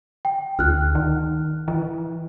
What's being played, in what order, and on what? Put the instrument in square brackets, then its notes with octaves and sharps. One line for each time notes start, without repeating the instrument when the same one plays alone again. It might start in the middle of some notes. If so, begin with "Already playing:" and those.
[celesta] G5
[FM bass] D2 [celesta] F6 F#6
[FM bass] D#3
E3